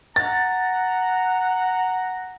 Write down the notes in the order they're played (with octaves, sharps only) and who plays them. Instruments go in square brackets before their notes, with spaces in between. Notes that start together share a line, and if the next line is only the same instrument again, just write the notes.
[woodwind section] F#5 A#5 [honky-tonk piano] A6